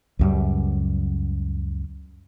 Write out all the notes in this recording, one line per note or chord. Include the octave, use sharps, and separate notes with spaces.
C#2 F#2 G3